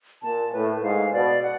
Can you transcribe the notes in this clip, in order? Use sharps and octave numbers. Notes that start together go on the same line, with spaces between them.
A#2 A5
A2 B4
G#2 F5
B2 D5
F#5